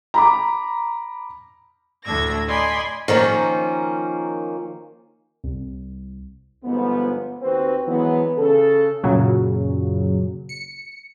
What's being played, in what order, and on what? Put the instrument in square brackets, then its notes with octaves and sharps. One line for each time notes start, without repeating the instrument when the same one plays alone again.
[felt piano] A#5 B5 D6
[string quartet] D2 A2 D4 E5 G#6 A#6
D5 D#5 G#5 B5 C6
[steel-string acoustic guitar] D#3 F3 A#3 C#4
[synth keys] C2
[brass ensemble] G1 G#2 F3 B3
D#2 C4 F#4 B4 C5
E3 F#3 G#3 B3
C#3 A4
[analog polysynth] F#2 A#2 C#3 F#3
C#7